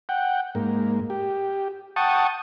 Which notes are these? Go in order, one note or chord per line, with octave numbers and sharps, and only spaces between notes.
F#5 G5
G#2 A#3
G4
F#5 G5 A5 C#6 D#6